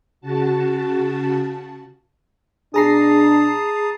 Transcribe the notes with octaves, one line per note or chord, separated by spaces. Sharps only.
C#3 F#4 A5
B2 D4 G#4 A5 A#5 D#6 C7